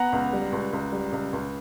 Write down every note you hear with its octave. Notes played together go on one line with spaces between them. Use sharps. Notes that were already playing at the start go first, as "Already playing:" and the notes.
Already playing: B3 F#5 A#5
C#2
G3
C#2
C#2
G3
C#2
C#2